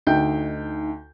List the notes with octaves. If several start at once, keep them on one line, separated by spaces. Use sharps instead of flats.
D2 D#4 G5 G6